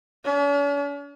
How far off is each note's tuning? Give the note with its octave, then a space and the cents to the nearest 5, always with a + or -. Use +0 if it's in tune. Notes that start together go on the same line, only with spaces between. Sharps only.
C#4 +45